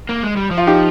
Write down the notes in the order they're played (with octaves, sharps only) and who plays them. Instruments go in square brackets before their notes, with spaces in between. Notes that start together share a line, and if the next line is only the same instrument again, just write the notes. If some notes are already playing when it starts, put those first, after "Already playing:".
[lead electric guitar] A#3
G#3
G3
F3
[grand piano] F4
D#4 G4